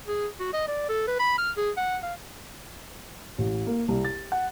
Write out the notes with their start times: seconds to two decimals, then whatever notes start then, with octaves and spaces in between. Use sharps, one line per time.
0.08 G#4
0.40 F#4
0.54 D#5
0.68 D5
0.89 A4
1.08 B4
1.20 B5
1.39 F6
1.57 G#4
1.77 F#5
2.03 F5
3.38 A1
3.67 A#3
3.88 C2
4.05 A6
4.32 F#5